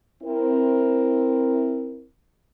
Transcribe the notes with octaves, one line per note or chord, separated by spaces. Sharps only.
C4 E4 A#4